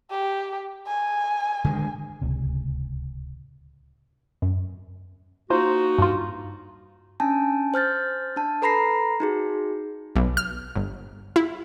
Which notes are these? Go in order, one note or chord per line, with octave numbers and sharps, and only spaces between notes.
G4
G#5
D3 D#3 G#3
D1 C#2 C3
F#2
A#3 D#4 F4 F#4 C5
G2 F4
C#4 D4 G#5 A5
C5 F6 G6 A6
D4 A5
A4 B4 A#5 B5 A#6 C7
D#4 F#4 G#4
B1
F6
G1
E4